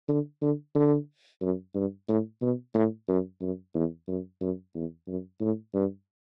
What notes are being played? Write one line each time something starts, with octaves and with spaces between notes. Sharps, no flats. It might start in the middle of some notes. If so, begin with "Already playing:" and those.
D3
D3
D3
F#2
G2
A2
B2
A2
F#2
F#2
E2
F#2
F#2
E2
F#2
A2
G2